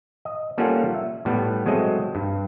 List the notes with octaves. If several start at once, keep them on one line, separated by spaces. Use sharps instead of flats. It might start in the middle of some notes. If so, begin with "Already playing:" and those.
D#5
G3 A#3 C#4 F4 A4 F#5
E5
A2 G3 B3
F#3 G#3 C4 A4 D#5 E5
G2